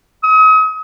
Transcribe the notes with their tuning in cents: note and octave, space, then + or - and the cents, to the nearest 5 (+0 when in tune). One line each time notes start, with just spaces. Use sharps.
D#6 +40